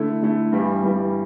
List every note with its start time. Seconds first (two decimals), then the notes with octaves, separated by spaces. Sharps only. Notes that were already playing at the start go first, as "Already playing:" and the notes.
Already playing: D3 A3 E4
0.22 D3 A3 E4
0.52 G2 E3 G3
0.83 G2 E3 G3